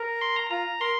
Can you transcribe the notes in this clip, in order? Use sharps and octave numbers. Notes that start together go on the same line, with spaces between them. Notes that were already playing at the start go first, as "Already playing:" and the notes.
Already playing: A#4
C6
A#5
F4 A#5
A#4 C6